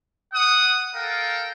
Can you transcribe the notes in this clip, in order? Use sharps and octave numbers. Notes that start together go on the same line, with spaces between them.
F#5 D#6
A4 A#4 F5 G5